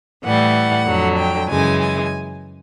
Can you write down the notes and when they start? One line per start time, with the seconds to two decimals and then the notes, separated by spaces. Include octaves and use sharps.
0.23 A2 E3 G3 F#5
0.87 F2 D3 F#3
1.18 G5
1.49 F#2 C#3 E3 G#3 G#5
1.81 G#5